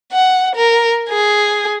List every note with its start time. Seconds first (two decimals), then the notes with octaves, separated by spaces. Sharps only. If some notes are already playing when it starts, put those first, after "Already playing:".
0.12 F#5
0.55 A#4
1.09 G#4